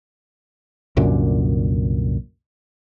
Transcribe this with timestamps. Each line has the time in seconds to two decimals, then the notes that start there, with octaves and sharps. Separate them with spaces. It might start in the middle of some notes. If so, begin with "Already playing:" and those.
0.97 C2 F#2 A#2 D3